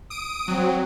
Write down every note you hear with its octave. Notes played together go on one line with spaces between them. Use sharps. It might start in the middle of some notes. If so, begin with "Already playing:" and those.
D#6 D7
F#3 C4